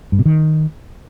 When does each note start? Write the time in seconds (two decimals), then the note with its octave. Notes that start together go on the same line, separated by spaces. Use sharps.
0.12 G2
0.19 B2
0.25 D#3